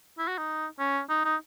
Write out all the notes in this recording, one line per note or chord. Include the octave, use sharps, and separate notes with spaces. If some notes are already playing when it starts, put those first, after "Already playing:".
E4
F#4
D#4
C#4
D#4
D#4